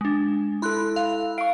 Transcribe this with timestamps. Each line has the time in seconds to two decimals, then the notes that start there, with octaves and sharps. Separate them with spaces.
0.01 G#3 D4
0.62 E4 A4 B5 C6 F#6
0.96 F5
1.38 F5 C#6 D7